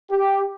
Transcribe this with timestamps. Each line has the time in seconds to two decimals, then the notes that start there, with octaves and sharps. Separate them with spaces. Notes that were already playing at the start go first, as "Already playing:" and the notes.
0.11 G4